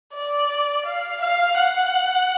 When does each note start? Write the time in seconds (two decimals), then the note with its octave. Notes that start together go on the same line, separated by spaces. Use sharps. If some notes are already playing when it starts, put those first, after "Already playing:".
0.14 D5
0.86 F5
1.22 F5
1.58 F#5